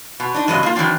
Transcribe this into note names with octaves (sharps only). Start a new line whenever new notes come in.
B2
D4 D#4
E2 G2 C#3 F#3 G#3 D#5
A#3 F4
D#3 E3 F#3 C4 D4